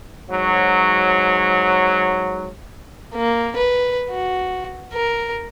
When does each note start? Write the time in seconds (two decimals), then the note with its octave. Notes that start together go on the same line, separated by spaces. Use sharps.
0.30 G#2 F#3
3.15 A#3
3.56 B4
4.11 F#4
4.93 A#4